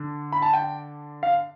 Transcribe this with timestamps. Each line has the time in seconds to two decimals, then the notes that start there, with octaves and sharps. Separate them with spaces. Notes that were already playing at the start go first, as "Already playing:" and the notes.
Already playing: D3 D4
0.32 B5
0.42 A5
0.53 G5
1.23 F5